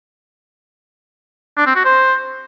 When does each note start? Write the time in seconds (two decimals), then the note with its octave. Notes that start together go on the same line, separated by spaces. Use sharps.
1.57 D4
1.67 C4
1.76 F#4
1.85 C5